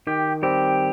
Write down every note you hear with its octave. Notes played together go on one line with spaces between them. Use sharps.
D#3 G4
G3 C4 G4